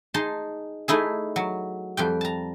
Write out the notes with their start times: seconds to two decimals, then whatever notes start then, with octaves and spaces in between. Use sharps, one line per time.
0.14 D#4 G#4 A5 C6
0.88 A3 D#4 E4 G#4
1.36 F#3
1.97 F2 G3 G5
2.21 A5 A#5